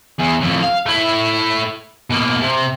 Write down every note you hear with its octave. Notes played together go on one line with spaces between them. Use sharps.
E2
F2 A2
F5
A3 E4
B2 A#3
C3